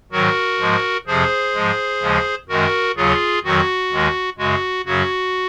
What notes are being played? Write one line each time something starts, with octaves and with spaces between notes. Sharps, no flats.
G#2 D#3 F#3 F#4 A#4
G#2 F3 G#3
F2 C3 F3 G#4 C5
G#2 F3 G#3
D#2 C#3 F3 G#3
F#2 D#3 G#3 F#4 A#4
D#2 C#3 F#3 F4 G#4
F2 D#3 F#3 F#4
D#2 D#3 G#3
F#2 C#3 G#3 F#4
F#2 C#3 F#3 F#4